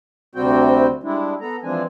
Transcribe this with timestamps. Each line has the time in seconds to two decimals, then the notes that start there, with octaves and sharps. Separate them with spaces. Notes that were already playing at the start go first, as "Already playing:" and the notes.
0.35 D2 C3 G3 C4 F#4 G5
1.03 G3 G#3 D4 E4
1.41 B3 A4 A#5
1.63 E3 F3 G#3 C4 D4 G#5